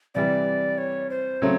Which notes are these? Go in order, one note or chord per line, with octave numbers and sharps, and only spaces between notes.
C3 E3 G3 D5
C#5
C5
C#3 F#3 A3 C4 C#5